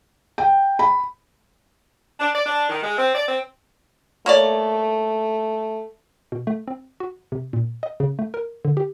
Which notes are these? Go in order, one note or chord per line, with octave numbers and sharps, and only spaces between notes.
G5
B5
D4
D5
D4
D#3
G#3
C4
D5
C4
A3 A#3 C#5 D5
B2
A3
C4
F#4
C3
A#2
D#5
C#3
A3
A#4
D3
G4